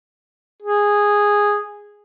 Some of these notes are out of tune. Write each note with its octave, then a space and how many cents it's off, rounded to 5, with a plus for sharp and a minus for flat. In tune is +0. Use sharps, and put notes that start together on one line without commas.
G#4 -10